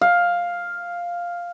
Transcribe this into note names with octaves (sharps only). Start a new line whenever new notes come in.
F5